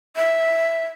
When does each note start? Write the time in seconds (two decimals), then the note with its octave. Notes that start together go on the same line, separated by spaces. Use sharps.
0.17 E5